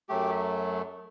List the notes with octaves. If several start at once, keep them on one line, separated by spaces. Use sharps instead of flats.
F#2 F#3 A3 G4